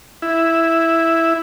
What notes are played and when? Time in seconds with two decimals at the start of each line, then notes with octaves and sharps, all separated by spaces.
0.22 E4